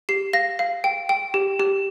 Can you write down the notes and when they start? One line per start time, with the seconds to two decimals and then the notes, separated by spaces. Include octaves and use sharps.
0.09 G4 C7
0.33 F5 A#6
0.59 F5
0.84 G5
1.09 G5
1.34 G4
1.60 G4